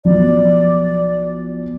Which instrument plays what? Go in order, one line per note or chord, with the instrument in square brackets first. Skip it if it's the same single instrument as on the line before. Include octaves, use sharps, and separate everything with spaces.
[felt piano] B1 F3 [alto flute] D5